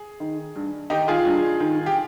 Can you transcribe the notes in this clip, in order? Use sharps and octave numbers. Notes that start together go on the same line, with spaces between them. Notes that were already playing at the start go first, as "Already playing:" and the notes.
Already playing: G#4
D#3
G2
D#3 D#4 G4
F4 G#4
G2
D#3
G4